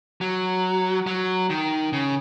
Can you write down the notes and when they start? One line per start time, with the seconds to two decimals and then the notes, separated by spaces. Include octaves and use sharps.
0.21 F#3
1.07 F#3
1.50 D#3
1.93 C#3